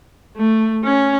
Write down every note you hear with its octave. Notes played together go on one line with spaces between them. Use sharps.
A3
C#4